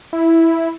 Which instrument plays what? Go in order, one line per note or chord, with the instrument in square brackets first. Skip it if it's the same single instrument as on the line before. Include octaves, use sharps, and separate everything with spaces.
[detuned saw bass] E4